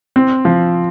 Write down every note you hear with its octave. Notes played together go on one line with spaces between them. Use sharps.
C4
F3